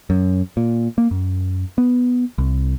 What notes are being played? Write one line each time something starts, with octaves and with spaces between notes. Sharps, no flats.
F#2
A#2
A#3
F#2
B3
C2